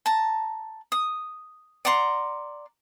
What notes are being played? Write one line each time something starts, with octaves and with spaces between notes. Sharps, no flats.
A5 A#5
D#6
D5 F#5 A#5 C6